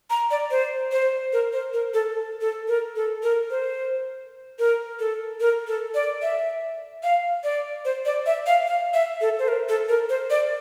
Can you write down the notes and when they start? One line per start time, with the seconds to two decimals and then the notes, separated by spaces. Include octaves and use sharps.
0.10 A#5
0.31 D5
0.51 C5
0.91 C5
1.33 A#4
1.53 C5
1.73 A#4
1.94 A4
2.41 A4
2.68 A#4
2.96 A4
3.23 A#4
3.50 C5
4.59 A#4
5.00 A4
5.40 A#4
5.67 A4
5.95 D5
6.22 E5
7.03 F5
7.44 D5
7.85 C5
8.05 D5
8.26 E5
8.46 F5
8.67 F5
8.94 E5
9.21 A4
9.39 C5
9.48 A#4
9.69 A4
9.89 A#4
10.09 C5
10.30 D5